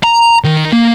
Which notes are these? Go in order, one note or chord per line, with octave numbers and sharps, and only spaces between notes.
A#5
D#3
A#3